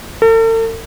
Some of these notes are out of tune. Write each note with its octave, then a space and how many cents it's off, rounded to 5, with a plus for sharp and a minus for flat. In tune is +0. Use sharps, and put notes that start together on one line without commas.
A4 +45